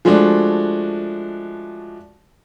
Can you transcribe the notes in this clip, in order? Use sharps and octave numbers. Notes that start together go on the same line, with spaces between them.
F3 G#3 A3 D4 F#4